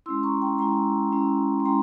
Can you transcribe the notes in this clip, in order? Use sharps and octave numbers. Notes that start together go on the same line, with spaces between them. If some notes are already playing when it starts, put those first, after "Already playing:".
G#3 C#4 E4 C6 E6
A#5 C#6
G5 A#5
G#3 C#4 E4 G5 A#5
G#3 C#4 E4
C6
G#3 C#4 E4 G5 A#5